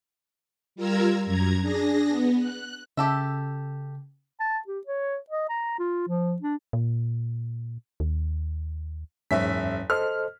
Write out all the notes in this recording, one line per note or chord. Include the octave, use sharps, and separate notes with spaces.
G3 F4 A#4 A#5 E6 G#6
F#2 A#5 G#6
D4 G#4 A#6
B3
F#6
C#3 G4 A4 E5
A5
G4
C#5
D#5
A#5
F4
F3
D4
A#2
D#2
F#1 E2 G#2 C#4 E5 B6
A4 C5 D#5 F6